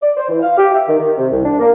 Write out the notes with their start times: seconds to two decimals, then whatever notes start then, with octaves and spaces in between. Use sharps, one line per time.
0.01 D5
0.17 C5
0.29 E3
0.41 F5
0.57 G4
0.72 E5
0.87 D#3
0.98 D#3
1.18 C3
1.31 C2
1.44 D4
1.60 A#3